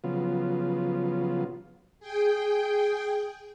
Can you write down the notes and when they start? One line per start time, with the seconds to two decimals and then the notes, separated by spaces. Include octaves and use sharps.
0.04 C#3 F3 F#3 B3 F4
1.99 G#4 G5